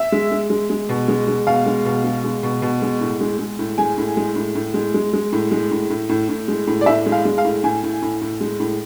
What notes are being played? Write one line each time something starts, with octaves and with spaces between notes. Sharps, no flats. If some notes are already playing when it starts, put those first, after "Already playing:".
Already playing: E5
G#3
G#3
G#3
G#3
B2
G#3
G#3
B2 F5
G#3
B2
G#3
G#3
B2
B2
G#3
A2
G#3
G#3
A2
G#3 G#5
A2
G#3
A2
A2
G#3
G#3
G#3
A2
G#3
A2
A2
A2
A2
G#3
A2
D5
A2 E5
G#3
F5
G#3
F5
A2
A2 G#5
A2
A2
A2
G#3
A2